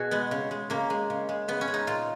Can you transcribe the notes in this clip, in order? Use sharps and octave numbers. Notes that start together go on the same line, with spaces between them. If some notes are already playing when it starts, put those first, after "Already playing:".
Already playing: B2 F#4 G#4
G#3 B3
C#3
G#3
C#3 A#3
G#3
C#3
G#3
C#3 B3
C#4
G#3
D#4
A#2 F4